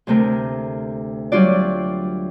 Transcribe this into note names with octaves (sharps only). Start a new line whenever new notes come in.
D2 C3 A3 A#4
F#3 G3 F4 D5